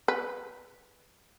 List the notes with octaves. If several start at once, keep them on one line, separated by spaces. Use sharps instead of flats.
B4